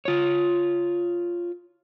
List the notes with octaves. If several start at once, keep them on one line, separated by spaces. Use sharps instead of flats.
F4 C#5